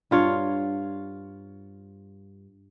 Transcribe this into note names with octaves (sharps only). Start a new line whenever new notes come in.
G2 F4 C#5